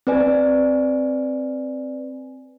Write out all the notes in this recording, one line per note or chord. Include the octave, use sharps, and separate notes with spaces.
C4 B4 D5 G#5